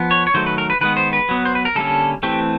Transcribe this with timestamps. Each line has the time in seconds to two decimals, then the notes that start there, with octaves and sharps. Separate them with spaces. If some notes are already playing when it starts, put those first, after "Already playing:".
Already playing: F3 B3
0.11 C#5
0.27 C#5
0.34 D#3 F#3 A3 C5
0.46 B4
0.58 A#4
0.70 B4
0.81 D#3 G#3 B3 B4
0.97 C5
1.13 B4
1.29 F#3 B3
1.45 C5
1.55 B4
1.65 A#4
1.76 D3 G3 A#3 C#4 A4
2.23 E3 A3 C4 G4